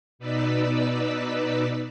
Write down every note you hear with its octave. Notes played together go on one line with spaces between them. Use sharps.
B2 D#4 B4 D5 E6 B6